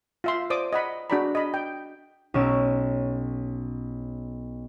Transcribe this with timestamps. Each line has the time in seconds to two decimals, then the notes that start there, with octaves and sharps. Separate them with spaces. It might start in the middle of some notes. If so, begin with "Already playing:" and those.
0.24 F4 E5 C6
0.50 C5 D5 D6 D#6
0.73 D#5 F#5 B5
1.10 D4 F#4 G#4 D5 A#5 B5
1.35 D#5 B5
1.54 G5
2.34 B1 C#4 E6 D7